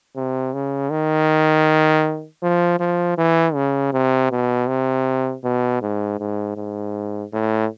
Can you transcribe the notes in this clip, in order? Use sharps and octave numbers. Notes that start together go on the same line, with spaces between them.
C3
C#3
D#3
F3
F3
E3
C#3
C3
B2
C3
B2
G#2
G#2
G#2
A2